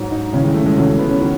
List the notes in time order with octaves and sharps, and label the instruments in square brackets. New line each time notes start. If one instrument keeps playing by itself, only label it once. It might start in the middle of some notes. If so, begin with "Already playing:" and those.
Already playing: [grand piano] G#2 F#3
D#4
D#2 C#3 E3 C#4
G#3
A3
G#3
E2 C#3 F#3 A3
C#4
B3
C#4
D#3 F#3